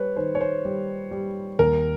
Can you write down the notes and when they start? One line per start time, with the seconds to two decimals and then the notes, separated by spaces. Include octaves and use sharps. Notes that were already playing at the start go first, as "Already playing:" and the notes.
Already playing: G3 B4 C#5
0.16 D#3 C5
0.35 C#5
0.41 C5
0.65 G3
1.11 G3
1.59 D#2 A#4